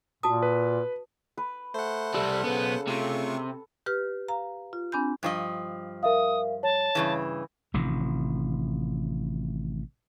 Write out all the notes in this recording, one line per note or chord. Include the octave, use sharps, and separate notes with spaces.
A#2 F#4 A5 D#6
B4
B4
A3 C5 F#5
C2 G3 A4
B1 C#3 B3
C3 A3 F4 C#6
G4 B4 F6
F5 A#5
F4
C4 D4 G#5 B5 G6
G2 F3 D#5
A#4 E5 F5 D#6
C#5 A5
G2 C#3 E3
A1 C3 D#3 F3